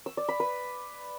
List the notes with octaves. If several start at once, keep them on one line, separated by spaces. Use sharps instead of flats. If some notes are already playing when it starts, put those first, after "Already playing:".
E6
D5
B5
B4